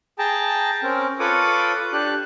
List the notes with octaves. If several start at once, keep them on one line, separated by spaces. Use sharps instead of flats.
G#4 G5 A5 A#5
C4 C#4 A#4
F4 A4 B4 C#5 D6 D#6
D4 G4 F#6